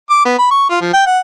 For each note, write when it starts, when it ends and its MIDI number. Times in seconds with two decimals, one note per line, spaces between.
0.10 0.25 86
0.25 0.36 59
0.38 0.47 83
0.51 0.66 85
0.70 0.79 65
0.81 0.93 53
0.94 1.03 79
1.06 1.19 78